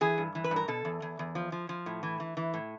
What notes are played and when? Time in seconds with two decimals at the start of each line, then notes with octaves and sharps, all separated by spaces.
0.01 E3 G#4
0.18 G2
0.35 E3
0.44 B4
0.51 G2
0.56 A#4
0.68 B2 A4
0.85 E2
1.02 E2
1.19 E2
1.35 F3
1.52 F3
1.69 F3
1.86 A2
2.03 E3
2.20 E3
2.37 E3
2.54 A2